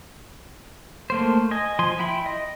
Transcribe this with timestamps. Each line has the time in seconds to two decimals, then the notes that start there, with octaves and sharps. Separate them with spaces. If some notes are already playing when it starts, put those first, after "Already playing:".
1.10 A3 A#3 C5
1.51 D#5 G#5
1.79 F3 G#5 C6
1.99 E4 E5 G5 B5 C6
2.26 D#5